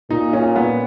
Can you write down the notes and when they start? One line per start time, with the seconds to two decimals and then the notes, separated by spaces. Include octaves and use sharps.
0.10 A#2 D#4
0.33 C#4
0.56 B3